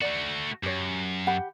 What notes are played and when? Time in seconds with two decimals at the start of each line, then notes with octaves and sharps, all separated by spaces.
0.01 A3 F#4 D5
0.63 F#2 G4 C#5
1.27 G4 F#5 B5